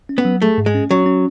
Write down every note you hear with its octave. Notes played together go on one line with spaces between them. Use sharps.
C#4
B3
F#3
A3 G#4
G#2
G#3
C#4
F#3 C#4
C#4